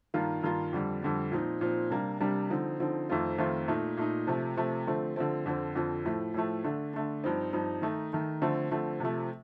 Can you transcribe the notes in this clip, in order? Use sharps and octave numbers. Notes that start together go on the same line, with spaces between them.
G2 D#3 A#3 F4
G2 D#3 A#3 F4
F2 D3 G3
F2 D3 G3
A#2 F3 C4 D#4
A#2 F3 C4 D#4
C3 G3 A#3 D4
C3 G3 A#3 D4
D3 F3 C4 D#4
D3 F3 C4 D#4
F2 D#3 A3 C4 F4
F2 D#3 A3 C4 F4
A#2 A3 D#4
A#2 A3 D#4
C3 F3 A3
C3 F3 A3
D3 F3 A3 C4
D3 F3 A3 C4
F2 D3 F3 C4
F2 D3 F3 C4
A2 F3 A3
A2 F3 A3
D3 A3 D4
D3 A3 D4
G2 F3 C4 D#4
G2 F3 C4 D#4
D#3 A3 D#4
D#3 A3 D#4
D3 F3 A3 C4
D3 F3 A3 C4
C3 F3 A3